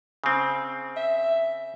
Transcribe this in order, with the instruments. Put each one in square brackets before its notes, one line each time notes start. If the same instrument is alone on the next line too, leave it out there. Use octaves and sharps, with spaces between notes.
[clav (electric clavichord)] C#3 C4
[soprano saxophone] E5